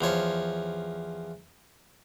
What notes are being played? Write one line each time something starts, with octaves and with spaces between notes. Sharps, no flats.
E2 F3 C#5 C6